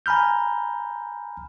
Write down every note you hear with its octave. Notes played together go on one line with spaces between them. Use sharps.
G#5 A#5 B5 F6 G6